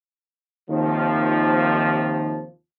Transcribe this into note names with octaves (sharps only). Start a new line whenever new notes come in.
D#2 C3 D#3 F3